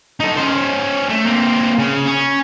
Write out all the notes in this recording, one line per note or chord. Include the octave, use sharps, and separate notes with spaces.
D#4 A4
C#4 C5
A3
A#3 C4
C#3
C#4